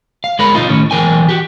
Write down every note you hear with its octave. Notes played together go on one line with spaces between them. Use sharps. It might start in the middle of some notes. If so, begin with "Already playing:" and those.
F5
G#3 A#4 C#5 B5
B2 F3 D#4 F4
A2 D#3 C#4 C#5
B1 A#2 E3 A#4 G5 G#5
F#4 G4